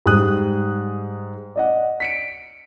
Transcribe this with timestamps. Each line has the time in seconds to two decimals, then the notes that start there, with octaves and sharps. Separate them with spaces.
0.06 G#2 G3 G#4 D#6 F#6
1.56 D5 D#5 F#5
2.00 B6 C#7 D7